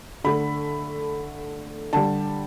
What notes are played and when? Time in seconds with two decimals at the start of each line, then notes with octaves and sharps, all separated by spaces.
0.24 D3 A3 B5
1.93 D3 G3 A5